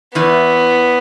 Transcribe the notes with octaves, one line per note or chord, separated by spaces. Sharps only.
E2 E3 B3